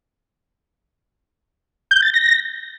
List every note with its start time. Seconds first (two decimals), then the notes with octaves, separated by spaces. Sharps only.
1.91 G6
2.02 A6
2.14 A#6